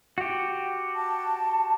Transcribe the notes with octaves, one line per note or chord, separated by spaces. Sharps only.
F#4 G4
A5